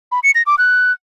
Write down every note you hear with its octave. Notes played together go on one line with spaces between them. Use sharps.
B5
C#7
A#6
D6
F#6